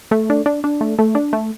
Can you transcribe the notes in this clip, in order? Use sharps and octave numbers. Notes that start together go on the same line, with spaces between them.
A3
D4
D4
D4
A3
A3
D4
A3